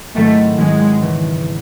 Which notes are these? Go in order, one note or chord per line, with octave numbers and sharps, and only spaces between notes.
G#2 D#3 F#3 A3 C4 E4
G#2 D#3 F#3 G#3 C4 E4
E2 C#3 E3